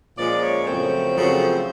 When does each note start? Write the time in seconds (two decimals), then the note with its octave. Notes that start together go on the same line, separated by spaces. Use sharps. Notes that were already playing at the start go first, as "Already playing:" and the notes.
0.18 A#2 F3 G#3 C#4 D5
0.42 C#5
0.67 F#2 C#3 F3 A3 C4 C5
1.16 F#2 C#3 F3 A3 C4